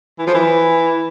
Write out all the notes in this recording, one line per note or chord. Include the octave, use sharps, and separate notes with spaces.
E3
F3
E3